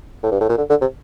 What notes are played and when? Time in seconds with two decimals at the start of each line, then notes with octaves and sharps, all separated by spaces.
0.23 A2
0.32 G2
0.41 A2
0.49 A#2
0.58 D3
0.70 D3
0.81 C3